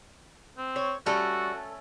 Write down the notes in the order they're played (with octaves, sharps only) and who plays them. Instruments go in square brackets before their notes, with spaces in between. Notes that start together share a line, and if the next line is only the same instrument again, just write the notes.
[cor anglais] C4
[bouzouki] C#5
[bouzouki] G3 [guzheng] A3 C#4 A4 [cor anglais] F#4